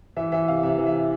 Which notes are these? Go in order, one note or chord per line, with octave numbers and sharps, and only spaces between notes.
E3 E5
E3 E5
C3 F5
C3 E5
E3
E5